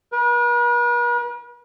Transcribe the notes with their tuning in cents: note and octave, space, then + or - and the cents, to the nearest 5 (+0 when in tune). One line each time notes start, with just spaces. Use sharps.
B4 -45